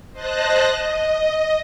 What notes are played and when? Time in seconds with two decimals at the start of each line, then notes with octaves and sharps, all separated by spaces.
0.13 C5 D#5 A5 F#6 A#6
0.77 D#5